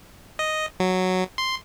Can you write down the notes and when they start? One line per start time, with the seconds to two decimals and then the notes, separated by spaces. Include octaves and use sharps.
0.39 D#5
0.80 F#3
1.38 C6